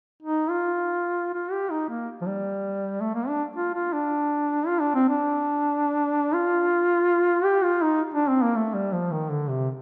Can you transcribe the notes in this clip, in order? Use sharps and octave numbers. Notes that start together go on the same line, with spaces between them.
D#4
F4
F4
G4
D#4
A#3
F3
G3
A3
A#3
D4
F4
F4
D4
F4
D4
C4
D4
F4
G4
F4
D#4
D4
C4
A#3
A3
G3
F3
D#3
D3
C3